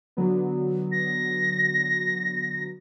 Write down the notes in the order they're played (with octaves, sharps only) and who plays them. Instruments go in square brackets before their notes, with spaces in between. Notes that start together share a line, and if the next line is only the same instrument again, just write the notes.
[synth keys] D3 F#3 B3
[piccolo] A#6